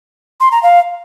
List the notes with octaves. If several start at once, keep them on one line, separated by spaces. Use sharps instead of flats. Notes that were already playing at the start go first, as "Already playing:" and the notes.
C6
A#5
F5